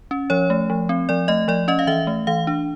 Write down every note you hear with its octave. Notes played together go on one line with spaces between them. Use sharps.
C#4
F3 C#5
A3
F3
C4
F3 D5
A3 D#5
F3 D5
C#4 D#5
F5
E3 E5
A3
E3 F5
D4